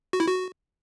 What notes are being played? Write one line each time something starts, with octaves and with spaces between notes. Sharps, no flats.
F#4
E4
F#4